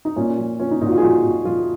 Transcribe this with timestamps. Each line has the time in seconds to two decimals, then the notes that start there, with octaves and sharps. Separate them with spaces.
0.05 D#4
0.16 A#2 C#4
0.38 F3
0.60 F3 C#4
0.71 D#4
0.81 A#2 D#4
0.87 F#4
0.92 F4
0.98 G#4
1.02 F3 F#4
1.24 A#2
1.45 F3 F4